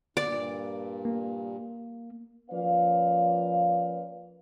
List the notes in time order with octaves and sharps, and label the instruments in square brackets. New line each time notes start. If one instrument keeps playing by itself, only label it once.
[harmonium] G2 A#2 [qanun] D5
[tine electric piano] A#3
[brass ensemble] F3 A#3 C#4 B4 D5 F5